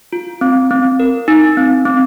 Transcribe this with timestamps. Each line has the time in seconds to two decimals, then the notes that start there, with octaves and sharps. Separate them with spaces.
0.13 F4
0.41 C4
0.71 C4
1.00 A#4
1.28 D#4
1.57 C4
1.85 C4